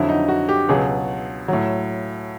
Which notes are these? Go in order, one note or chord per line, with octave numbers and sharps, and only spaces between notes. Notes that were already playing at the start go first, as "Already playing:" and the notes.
Already playing: F2 D3 F#3 E4
D#4
F#4
G4
C#2 B2 F#3 G#4
A2 F#3